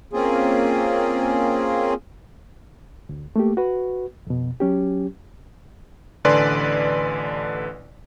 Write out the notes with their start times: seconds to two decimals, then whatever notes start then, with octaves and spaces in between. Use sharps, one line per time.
0.13 A#3 C4 C#4 F4 G#4
3.09 D2
3.36 A3 A#3 G4
3.57 F#4 B4
4.27 F2 B2
4.60 F#3 C#4 G4
6.25 A1 D3 B4 D5 G#5 C6